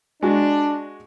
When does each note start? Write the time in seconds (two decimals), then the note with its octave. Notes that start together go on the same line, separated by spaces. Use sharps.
0.23 G#3 D4 F#4